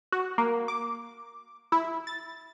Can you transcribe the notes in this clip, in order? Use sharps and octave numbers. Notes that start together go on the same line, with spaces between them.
F#4
A#3
D6
E4
A6